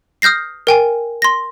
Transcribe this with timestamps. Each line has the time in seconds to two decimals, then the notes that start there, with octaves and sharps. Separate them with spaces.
0.22 D#6 F6 G6 A#6 C7
0.67 A#4 G5 G#5
1.22 C6 A#6